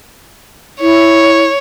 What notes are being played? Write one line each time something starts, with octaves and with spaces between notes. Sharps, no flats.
E4 C#5